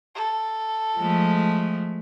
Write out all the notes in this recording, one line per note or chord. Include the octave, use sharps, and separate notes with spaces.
A4
F3 G#3 A3